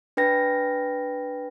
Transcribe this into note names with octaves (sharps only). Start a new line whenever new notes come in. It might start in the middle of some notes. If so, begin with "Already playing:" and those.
D4 B4 G5 A#6